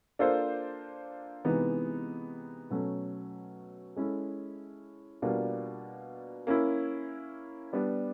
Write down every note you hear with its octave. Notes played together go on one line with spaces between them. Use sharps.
A#3 D4 F4 A4 C5
C3 E3 G#3 B3 D#4
B2 F#3 A3 C#4
G#3 C#4 E4 A4
B2 G3 A#3 D4 F4
A#3 C#4 E4
G3 B3 D4